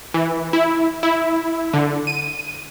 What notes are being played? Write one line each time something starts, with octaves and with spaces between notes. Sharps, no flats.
E3
E4
E4
D3
D#7